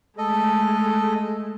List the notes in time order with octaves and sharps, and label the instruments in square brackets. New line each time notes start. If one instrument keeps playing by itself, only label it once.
[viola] G#3 A3 [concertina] A4 D#5